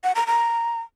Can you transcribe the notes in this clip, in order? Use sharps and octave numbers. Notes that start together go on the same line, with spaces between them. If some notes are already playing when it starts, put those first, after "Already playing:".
F#5
A#5
A#5